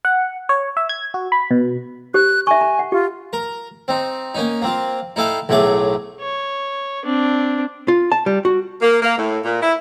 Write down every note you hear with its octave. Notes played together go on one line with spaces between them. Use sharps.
F#5
C#5
E5
G#6
F#4
B5
B2
G4 C5 F#6
E5 G#5 C#6
A#5
F#5
F4 G4
A#4
C4 D#4
A#3 C#4 D#4
A#3 C4 F4
D#4 E4 A4 F5 G5
B1 A2 F#3 A3 G#4 D6
C#5
C4 D4
F4
A5
G3
F#4
A#3
A#3
A2
A#2
E4